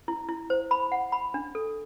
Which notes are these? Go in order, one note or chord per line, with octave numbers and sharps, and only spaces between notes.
E4
E4
C5
B5
F#5
B5
D4
A4